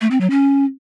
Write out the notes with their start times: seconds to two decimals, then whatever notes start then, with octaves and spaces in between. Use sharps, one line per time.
0.01 A3
0.11 C4
0.21 F#3
0.30 C#4